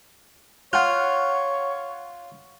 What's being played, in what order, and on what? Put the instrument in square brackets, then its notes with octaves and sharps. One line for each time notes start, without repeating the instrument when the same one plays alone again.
[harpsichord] F4 [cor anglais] C#5 [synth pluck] F#5 F6